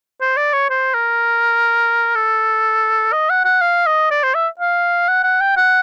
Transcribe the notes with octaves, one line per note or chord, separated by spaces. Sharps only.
C5
D5
C#5
C5
A#4
A4
D#5
F#5
F#5
F5
D#5
D5
C5
E5
F5
F#5
F#5
G5
F#5